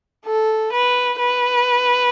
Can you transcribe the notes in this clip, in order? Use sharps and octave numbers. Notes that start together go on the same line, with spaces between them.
A4
B4
B4